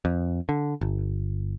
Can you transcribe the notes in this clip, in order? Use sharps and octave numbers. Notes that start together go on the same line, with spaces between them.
F2
D3
G1